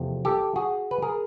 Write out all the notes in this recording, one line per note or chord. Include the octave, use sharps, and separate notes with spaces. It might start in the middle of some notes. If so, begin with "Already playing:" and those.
Already playing: E2 C3 F3 A3 C4
G4 A4
F#4 G#4
B4
G#4 A#4